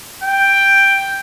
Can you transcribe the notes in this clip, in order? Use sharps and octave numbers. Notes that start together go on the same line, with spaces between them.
G5